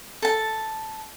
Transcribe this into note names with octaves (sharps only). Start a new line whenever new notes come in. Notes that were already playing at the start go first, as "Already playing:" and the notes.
A4 A5